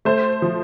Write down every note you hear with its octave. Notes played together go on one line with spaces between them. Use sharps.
A3 C5
F3